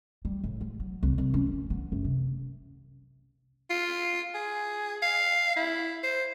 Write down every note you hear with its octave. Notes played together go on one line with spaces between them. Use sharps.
G3
A2
G#3
F#3
C2
C2
C#4
D2
B3
F#2
C3
F4
G#4
F5
E4
C5